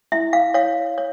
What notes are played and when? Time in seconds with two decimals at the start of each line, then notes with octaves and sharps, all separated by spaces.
0.12 E4 E5
0.33 F5
0.54 C#5 F5
0.98 C#5